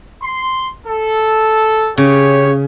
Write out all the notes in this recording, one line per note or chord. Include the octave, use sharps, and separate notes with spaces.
C6
A4
C#3 G4 C#5